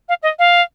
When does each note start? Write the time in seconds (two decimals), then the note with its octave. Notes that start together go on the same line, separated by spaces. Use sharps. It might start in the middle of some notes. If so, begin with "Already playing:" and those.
0.09 F5
0.23 D#5
0.39 F5